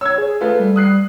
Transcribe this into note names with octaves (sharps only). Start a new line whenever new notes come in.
C#5 E6 G#6
G#4
A3 F4 B4
G3
D#6 F#6 C7